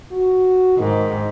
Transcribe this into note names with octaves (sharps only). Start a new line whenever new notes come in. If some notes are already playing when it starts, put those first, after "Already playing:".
F#4
G#2 D#3